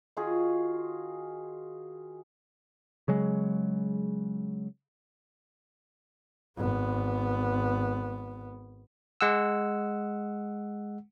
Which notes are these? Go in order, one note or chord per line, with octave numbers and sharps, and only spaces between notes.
D#3 F4 F#4 G#4
C#3 F#3 G#3
G#1 B3
G#3 F#5 E6